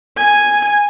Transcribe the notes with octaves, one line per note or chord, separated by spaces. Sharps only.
G#5